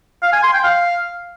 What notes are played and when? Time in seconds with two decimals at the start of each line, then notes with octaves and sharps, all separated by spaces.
0.22 F5
0.33 G#5
0.43 C6
0.53 G5
0.64 F5